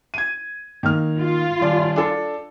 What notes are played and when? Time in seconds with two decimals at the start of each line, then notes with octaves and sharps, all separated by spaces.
0.14 G#6 D#7
0.83 D#3 A#3 F6
1.20 F4
1.61 D#1 D5
1.96 D4 A4